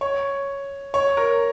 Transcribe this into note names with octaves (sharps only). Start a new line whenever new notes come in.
C#5
C#5
A#4